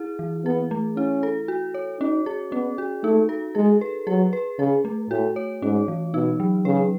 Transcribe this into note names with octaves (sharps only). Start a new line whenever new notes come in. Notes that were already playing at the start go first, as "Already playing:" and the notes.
Already playing: E4 G#4
E3
B3 G#4
A3
C#4 E4
A4
F#4
C#5
C#4 D#4
G#4
B3 C#4
F#4
A3 D#4
A4
G#3 G#4
B4
F#3 G#4
B4
C#3 G#4
A3
A2 F#4
C#5
G#2 C#4
E3
B2 D#4
F#3
C#3 B4